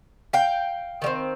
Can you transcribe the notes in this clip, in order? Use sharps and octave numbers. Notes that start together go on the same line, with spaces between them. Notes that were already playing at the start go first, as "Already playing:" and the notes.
F5 G5
D#3 G3 C4